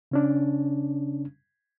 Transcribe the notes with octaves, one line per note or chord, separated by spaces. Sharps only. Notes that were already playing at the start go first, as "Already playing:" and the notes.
C#3 C#4 D4